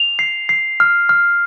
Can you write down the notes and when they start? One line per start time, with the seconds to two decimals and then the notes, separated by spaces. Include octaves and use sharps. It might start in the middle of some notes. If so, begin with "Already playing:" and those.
Already playing: F7
0.19 C7
0.49 C7
0.80 F6
1.09 F6